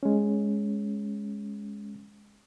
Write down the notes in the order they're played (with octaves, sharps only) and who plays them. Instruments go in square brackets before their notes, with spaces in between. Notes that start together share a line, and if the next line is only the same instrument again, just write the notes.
[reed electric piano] G#3 C#4